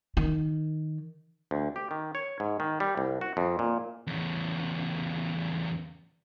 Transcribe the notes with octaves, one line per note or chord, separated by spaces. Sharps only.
D#3
D2
G4
D#3
C#5
G#2
D#3
G3
C2
F#4
F2
A#2
E2 C#3